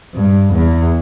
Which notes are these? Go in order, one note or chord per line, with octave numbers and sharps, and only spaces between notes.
G2
E2